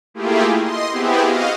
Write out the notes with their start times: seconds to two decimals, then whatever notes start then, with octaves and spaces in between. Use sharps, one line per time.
0.14 A3 A#3 E4 F4 G4 G#4
0.59 D#5 C6
0.90 B3 C4 E4 G4 G#4
1.22 F#4 D#5 F5